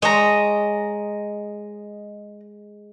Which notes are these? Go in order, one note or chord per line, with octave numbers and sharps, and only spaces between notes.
G#3 C#5 D#5 A#5